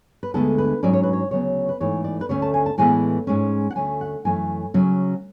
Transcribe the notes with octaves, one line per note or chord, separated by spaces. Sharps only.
B4
D2 D3 G#3 B3 A4
B4
G#2 F#3 C#4 D5
C#5
B4
C#5
D2 C#3 F#3 B3 C#5
B4
G#2 E3 A3 C#5
D5
B4
D2 D3 A3 C#4 C#5
A5
G#5
A5
A2 E3 G#3 B3 G#5
G#2 G#3 C#4
F#5
D2 D3 A3 C#4 G#5
F#5
F#2 E3 A3 C#4 G#5
C#3 F#3 C#4